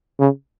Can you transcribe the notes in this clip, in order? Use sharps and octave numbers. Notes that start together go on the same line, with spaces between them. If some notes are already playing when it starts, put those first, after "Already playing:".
C#3